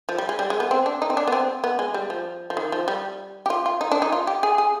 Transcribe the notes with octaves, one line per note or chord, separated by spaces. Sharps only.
F3
G3
G#3
G3
G#3
B3
C4
D4
D#4
C4
D4
B3
C4
B3
G#3
G3
F3
F3
D#3
F3
G3
G4
F4
F4
D#4
D4
D#4
F4
G4
G#4
G#4